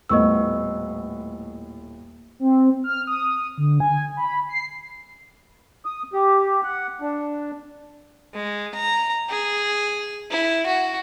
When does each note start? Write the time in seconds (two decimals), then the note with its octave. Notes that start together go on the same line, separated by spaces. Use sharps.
0.09 D#1 A2 B3 D#5 C#6 E6
2.39 C4
2.84 F6
3.07 D#6
3.58 D3
3.80 G#5
4.17 B5
4.49 C7
5.85 D#6
6.13 G4
6.64 F#5
7.01 D4
8.34 G#3
8.75 A#5
9.29 G#4
10.31 E4
10.66 F#4